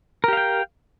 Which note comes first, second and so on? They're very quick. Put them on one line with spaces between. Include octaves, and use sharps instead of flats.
A#4 G4 F5 G5